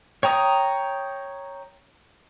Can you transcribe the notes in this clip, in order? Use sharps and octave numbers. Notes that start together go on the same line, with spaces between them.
C#5 G5 A#5 D#6